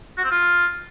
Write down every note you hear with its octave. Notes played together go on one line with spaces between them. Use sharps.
F#4
C4
F4